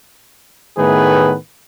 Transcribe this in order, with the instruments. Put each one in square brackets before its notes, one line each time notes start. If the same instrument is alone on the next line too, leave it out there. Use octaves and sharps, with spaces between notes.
[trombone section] A2 D#3 A3 B3 G#4 B4